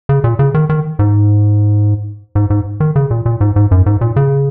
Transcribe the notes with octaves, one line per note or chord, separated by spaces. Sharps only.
C#3
A#2
C#3
D#3
D#3
G#2
G#2
G#2
D#3
C#3
A#2
A#2
G#2
G#2
F#2
G#2
A#2
C#3